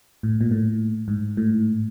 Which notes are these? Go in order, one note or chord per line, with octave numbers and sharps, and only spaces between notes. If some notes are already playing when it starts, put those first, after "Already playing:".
A2
A#2
A2
G#2
A2